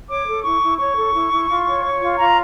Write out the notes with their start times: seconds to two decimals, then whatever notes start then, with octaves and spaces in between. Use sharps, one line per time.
0.09 C#5 D6
0.26 A4
0.43 E4 C#6
0.62 E4
0.78 C#5 C#6
0.96 A4
1.13 E4
1.31 E4
1.49 F4
1.66 C#5
1.83 C#5
2.01 F4
2.18 F4 A#5